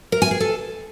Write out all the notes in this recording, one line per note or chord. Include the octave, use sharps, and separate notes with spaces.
A#4
G#5
G#4
A4